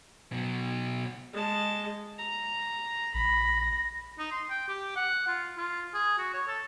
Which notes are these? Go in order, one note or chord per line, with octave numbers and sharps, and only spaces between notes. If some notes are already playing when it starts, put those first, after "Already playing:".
B2 F#3
G#3 A5
A#5
A#1 B5 A#6
D#4
C6
G5
G4
F#5
F4
F4
G#4
F#4
C#5
A4